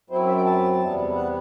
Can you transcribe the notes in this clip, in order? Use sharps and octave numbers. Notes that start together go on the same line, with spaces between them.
F#2 F#3 C4 E4 C5
E5
G5
A5
E2 C3 G3 B3
F#5